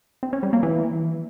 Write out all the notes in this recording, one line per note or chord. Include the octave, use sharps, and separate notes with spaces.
C4
C#4
G3
A#3
E3